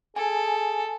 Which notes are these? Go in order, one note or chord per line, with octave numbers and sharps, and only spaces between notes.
G#4 A4 G#5